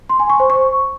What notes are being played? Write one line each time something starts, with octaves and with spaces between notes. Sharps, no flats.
C6
G#5
C#6
C5
C#6